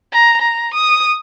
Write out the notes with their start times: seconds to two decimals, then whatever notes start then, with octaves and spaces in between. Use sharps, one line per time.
0.13 A#5
0.41 A#5
0.74 D#6